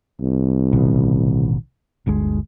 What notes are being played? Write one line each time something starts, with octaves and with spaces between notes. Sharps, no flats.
C2
A1 B2 D#3
G1 D2 G#3